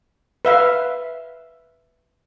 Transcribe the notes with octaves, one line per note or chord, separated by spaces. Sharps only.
B4 E5 F5